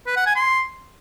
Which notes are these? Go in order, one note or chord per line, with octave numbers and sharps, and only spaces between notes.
B4
F#5
G#5
C6